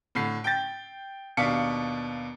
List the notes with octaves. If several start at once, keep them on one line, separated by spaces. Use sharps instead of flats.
A2 D3 C7
G5 G6 A6
D#2 B2 D4 F5 B6 C#7